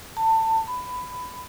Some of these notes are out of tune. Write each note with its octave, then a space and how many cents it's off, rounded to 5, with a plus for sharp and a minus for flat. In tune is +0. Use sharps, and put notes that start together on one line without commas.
A5 +25
B5 +15